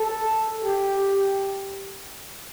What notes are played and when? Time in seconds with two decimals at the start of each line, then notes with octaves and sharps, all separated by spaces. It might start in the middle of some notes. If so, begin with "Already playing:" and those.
Already playing: A4
0.64 G4